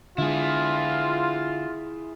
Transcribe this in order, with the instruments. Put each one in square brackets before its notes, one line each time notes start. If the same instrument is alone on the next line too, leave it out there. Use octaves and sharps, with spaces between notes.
[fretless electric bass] D3 G#3 [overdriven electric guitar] E4 G#4 [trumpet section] F4